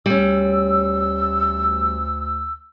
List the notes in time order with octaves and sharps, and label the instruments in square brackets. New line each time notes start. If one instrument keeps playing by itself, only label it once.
[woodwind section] D2 E6 [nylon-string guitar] G3 C#4